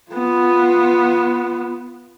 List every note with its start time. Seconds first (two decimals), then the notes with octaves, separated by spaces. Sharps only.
0.11 B3 F4